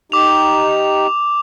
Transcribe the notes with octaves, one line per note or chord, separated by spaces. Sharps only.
D#4 G4 D6 F7